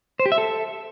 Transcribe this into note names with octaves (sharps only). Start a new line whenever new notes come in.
C5
G4
E5
A4